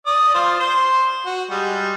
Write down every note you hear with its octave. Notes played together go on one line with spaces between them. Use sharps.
D5 D#6
F4 C5
C5 C6
F#4
G3 G#3